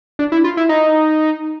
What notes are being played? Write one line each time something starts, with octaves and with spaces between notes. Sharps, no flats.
D4
E4
F4
E4
D#4